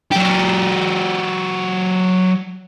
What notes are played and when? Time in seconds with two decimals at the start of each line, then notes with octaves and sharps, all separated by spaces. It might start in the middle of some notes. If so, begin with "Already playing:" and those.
0.12 F#3 G4